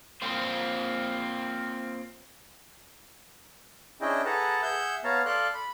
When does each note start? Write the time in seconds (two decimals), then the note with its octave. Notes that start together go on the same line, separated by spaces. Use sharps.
0.22 A#3 C4 F4 C5
4.01 C#4 D4 E4 G#4 D#5 G5
4.25 G#4 A4 B4 F#5 A5 A#5
4.63 G#4 E5 F#5 E6 G6
5.04 B3 C#5 F5 A5 A#5
5.26 A4 D5 F5 C6 F#6
5.54 B5